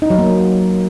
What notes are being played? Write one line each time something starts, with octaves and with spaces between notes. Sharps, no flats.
D#4
F#3
A#3